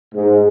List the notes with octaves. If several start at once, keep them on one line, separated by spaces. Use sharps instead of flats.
G#2